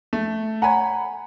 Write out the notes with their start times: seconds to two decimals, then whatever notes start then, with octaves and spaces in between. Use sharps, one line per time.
0.13 A3
0.62 C#5 F#5 G#5 A#5 B5